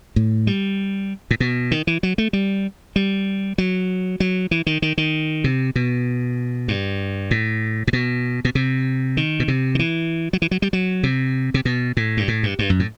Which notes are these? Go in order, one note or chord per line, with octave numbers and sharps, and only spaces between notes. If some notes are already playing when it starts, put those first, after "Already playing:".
A2
G3
A2
B2
D#3
E3
F#3
A3
G3
G3
F#3
F#3
E3
D#3
D#3
D#3
C3
B2
G2
A2
A2
B2
B2
C3
D#3
B2
C3
D#3
E3
F#3
E3
F#3
G3
F#3
C3
C3
B2
A2
G2
A2
G2
G2
F#2
A2